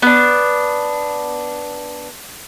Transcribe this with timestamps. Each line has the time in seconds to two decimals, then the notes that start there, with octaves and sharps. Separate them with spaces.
0.02 B3 D4